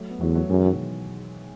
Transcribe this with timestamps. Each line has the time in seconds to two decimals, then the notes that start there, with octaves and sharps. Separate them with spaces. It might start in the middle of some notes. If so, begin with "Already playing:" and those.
Already playing: F#3 A3
0.10 B3
0.20 E2 F#3 A3
0.35 F#3 A3
0.50 F#2 E3 G#3
0.64 D#3 F#3
0.73 B2